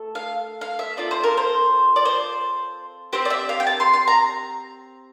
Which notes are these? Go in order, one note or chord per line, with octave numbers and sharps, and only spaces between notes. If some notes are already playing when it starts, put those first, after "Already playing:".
Already playing: A3 A4
F5
F5
E5
C4 F4 A4 D5
C5
A#4
C5
D5
C5
C4 G4 C5
D5
E5
F5
G5
A5
C6
C6
A#5